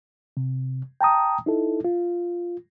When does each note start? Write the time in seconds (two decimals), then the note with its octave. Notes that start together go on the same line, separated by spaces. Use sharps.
0.37 C3
1.01 G5 A5 A#5 D#6
1.46 D#4 E4 A4
1.85 F4